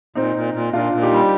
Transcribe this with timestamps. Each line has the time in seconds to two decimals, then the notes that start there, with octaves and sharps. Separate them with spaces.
0.15 A#2 C4 D#4
0.36 A#2
0.54 A#2
0.73 A#2 D4 F4
0.93 A#2
1.02 D#4 G4
1.12 G3